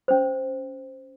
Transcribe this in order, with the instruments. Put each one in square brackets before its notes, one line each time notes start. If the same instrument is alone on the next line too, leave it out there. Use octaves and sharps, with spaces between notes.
[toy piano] C#4 C5